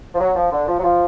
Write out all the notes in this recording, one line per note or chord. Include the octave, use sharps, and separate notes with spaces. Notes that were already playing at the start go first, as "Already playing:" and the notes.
F3
F#3
F3
D3
F3
F#3
F3